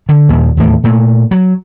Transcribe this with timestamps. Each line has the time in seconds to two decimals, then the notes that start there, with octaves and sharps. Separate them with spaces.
0.09 D3
0.29 D#2 A#2 F3
0.57 D#2 A2 E3 A3
0.84 A#2 A3
1.31 F#3